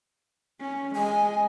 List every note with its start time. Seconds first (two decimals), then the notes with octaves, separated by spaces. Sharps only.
0.61 C#4
0.95 G#3 D#5 G#5